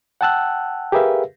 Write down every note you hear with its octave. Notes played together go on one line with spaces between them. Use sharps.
F#5 G5 A5 E6 F#6
G4 G#4 A#4 B4 E5 F5